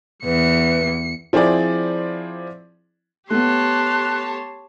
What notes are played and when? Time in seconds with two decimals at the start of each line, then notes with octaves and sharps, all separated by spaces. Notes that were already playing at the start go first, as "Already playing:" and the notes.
0.24 E2 B4 C#7
1.33 F3 C4 E4 G#4 D5
3.30 A3 B3 G4 C#5 A5 C6 F#6